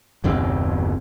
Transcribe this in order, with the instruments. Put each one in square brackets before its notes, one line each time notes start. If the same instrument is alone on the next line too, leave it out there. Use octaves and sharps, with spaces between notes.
[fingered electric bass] F#1 D#2 B2 C4